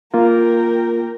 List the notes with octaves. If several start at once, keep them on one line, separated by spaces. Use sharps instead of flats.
A#3 F4 A#4 G5